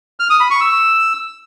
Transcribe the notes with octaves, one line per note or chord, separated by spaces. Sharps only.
F6
D#6
B5
C#6
E6